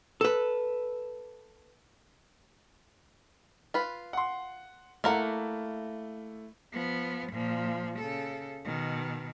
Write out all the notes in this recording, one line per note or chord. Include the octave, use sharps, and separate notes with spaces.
A4 B4
F4 B4
F#5 C6
A3 A#3 E4 A#4 F#5
F3 B3
A#2 F3
C#3 A4
B2 D#3